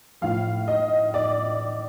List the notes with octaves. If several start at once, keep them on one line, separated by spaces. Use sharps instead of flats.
A2 F3 F5
D#5
D5